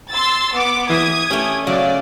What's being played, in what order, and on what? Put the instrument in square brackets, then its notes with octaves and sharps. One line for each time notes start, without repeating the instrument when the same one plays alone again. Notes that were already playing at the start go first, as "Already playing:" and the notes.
[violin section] C6 E6 A6
B3 D6
[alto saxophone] E3 [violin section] D#6 G#6
[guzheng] A3 C#4 [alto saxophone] G4
[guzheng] C#3 [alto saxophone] F#3 [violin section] D5